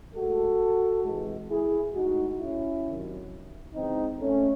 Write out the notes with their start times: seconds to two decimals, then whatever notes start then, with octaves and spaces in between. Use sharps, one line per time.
0.15 A2 G#3 F#4 A4
1.05 C3 E3 G#3
1.50 E4 G#4
1.95 A2 G#3 D#4 F#4
2.39 C#4 E4
2.84 C3 D#3 F#3
3.74 C#3 E3 G#3 C4 D#4
4.19 A3 C#4